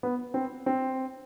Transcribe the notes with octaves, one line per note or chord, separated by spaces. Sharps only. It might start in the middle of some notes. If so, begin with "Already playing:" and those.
B3
C4
C4